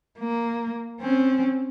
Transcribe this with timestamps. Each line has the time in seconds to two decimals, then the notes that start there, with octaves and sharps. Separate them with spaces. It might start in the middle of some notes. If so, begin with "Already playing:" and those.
0.19 A#3
1.01 C4 C#4